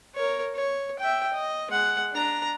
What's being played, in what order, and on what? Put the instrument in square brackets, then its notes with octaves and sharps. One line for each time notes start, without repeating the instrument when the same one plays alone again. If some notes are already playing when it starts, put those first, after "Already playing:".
[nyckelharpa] A#4 C#5
C#5
E5 G5
D#5
G#3 F#5
D4 A#5